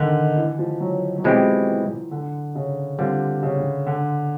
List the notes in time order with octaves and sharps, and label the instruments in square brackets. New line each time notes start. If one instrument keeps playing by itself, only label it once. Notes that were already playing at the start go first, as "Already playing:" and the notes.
Already playing: [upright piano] D3 D#3
E3
F3
F#3
F#3
[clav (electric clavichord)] B2 G#3 C4 E4 G4 [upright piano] F3
[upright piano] E3
D3
C#3
[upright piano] D3 [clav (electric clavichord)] G3 C4 F4
[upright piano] C#3
D3